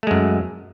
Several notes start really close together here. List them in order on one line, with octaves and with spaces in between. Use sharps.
A3 G#3 F#2